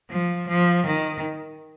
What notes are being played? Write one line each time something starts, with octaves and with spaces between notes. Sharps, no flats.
F3
F3
D#3